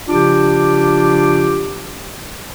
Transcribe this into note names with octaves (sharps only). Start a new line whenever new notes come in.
C#3 F3 D4 F4 G4 D6